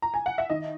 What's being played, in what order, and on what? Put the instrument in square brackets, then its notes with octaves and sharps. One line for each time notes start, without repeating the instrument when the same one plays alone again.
[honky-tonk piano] A#5
G#5
F#5
E5
D#3 D#5